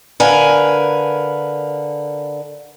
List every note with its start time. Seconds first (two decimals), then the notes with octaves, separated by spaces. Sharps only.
0.20 D3 A#4 B4 F5 G#5